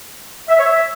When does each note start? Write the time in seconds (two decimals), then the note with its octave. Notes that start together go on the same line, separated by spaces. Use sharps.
0.49 E5
0.58 C#5
0.66 E5